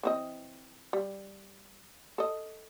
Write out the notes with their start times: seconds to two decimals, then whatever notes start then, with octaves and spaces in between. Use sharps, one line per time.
0.03 E3 C4 D#5
0.93 G3
2.18 A4 D#5